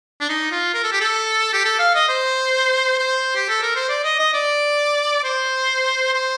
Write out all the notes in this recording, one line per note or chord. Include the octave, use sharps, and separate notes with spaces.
D4
D#4
F4
A#4
A4
G4
A4
G4
A4
F5
D#5
C5
C5
G4
A4
A#4
C5
D5
D#5
D#5
D5
C5
C5